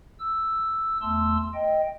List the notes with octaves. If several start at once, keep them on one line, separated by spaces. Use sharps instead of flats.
E6
E2 A3 A5 C6 E6
D#5 G5